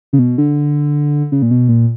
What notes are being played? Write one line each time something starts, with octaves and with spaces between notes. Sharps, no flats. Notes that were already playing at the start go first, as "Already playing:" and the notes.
C#3
B2
D3
C#3
A#2
B2
A#2